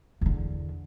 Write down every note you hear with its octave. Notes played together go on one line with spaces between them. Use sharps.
E2 D3